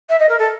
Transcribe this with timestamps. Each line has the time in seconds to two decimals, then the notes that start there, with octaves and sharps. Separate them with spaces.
0.09 E5
0.19 D#5
0.29 A#4
0.39 A4